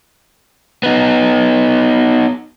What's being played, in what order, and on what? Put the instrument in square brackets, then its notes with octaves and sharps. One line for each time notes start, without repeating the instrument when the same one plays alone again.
[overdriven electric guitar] B3 D#4